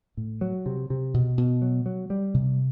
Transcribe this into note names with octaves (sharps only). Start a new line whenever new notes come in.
A2
F#3
C3
C3
B2
B2
F#3
F#3
G3
C3